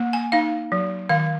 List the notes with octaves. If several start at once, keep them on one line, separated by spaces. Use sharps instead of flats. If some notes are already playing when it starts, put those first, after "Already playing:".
Already playing: A#3
G#5
D#4 F5
F#3
D#3 F5